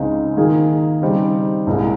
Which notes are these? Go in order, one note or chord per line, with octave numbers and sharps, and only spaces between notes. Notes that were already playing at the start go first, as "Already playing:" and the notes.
Already playing: C#2 C#3 G#3 C4 D#4
D#3 A#3 F4 G#4
C#3 G3 C4 D#4
C2 A#2 G#3